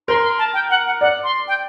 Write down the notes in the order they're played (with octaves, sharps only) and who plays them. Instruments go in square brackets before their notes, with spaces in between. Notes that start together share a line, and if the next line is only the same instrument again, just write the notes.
[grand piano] A#4 [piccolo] C6
[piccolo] C6
A5
G5
F#5
F#5
[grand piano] D5 [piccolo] F#5
[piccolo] C6
G5